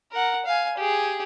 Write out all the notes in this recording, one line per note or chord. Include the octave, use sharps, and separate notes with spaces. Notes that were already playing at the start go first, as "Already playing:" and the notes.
A#4 F#5
F5 G#5
G4 G#4